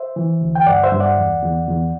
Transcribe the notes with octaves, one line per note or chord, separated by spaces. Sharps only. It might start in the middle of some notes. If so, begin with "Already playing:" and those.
Already playing: C5 E5
E3
D2
G5
G2 D5 F#5
C5 E5
G2
D5 F#5
E2
E2
E2